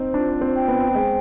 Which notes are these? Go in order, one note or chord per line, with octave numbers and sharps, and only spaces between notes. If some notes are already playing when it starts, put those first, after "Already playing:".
Already playing: C4 D#4 C5
D4 F4
C4
G5
B3
G#3 C5